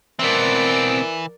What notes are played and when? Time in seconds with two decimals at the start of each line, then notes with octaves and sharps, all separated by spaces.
0.19 B2 E3 C4 A#4 D5